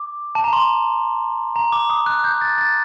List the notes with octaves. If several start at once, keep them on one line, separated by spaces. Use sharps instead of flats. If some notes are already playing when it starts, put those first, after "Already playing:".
Already playing: D6
A5
A#5
C6
A#5
D6
D#6
F#6
G6
A6
A6